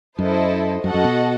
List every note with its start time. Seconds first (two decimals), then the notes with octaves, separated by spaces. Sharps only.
0.19 F#2 E4 A4 C5 D#5
0.83 F#2 F#4 A4 D#5 F#5
0.94 F#2
1.04 B2